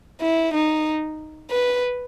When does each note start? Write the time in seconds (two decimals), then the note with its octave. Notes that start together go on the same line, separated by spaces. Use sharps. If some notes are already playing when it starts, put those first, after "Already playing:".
0.21 E4
0.54 D#4
1.51 B4